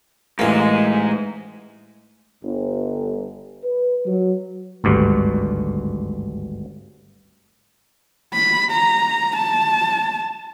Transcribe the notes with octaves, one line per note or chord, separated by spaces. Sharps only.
A1 G#2 G#3 A#3
G1
B4
F#3
G#1 D2 G2
B5
A#5
A5